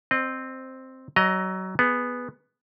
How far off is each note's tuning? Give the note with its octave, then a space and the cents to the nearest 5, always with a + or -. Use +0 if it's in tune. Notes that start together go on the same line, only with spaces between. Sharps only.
C4 +0 D#5 -30
F#3 +25 D#5 +0 A#5 +15
B3 +0 G#4 +0